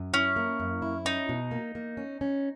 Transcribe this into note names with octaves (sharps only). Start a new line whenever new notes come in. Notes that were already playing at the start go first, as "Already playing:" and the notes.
Already playing: F#2
C#4 E4
A#3
F#2
E4
C#4 D#4
B2
A#3
A#3
C#4
C#4